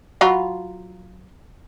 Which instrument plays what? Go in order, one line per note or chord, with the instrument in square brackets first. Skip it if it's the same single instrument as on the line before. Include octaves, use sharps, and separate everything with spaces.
[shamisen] F#3 F4 B5